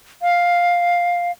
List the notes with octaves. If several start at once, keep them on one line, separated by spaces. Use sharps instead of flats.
F5